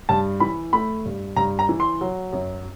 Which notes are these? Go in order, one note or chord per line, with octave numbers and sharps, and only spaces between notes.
G2 A5
E3 B5
A3 B5
G2
G2 A#5
A#5
E3
C6
F#3
F#2